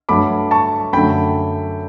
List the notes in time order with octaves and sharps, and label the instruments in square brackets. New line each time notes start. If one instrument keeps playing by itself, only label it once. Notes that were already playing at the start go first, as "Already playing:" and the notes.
[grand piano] G2 F#3 A3 B5 D6
A5 C#6
F#2 D3 F#3 A3 G5 B5